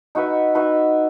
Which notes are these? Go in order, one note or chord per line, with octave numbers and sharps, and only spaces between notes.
D#4 F#4 B4 E5
D#4 F#4 B4 E5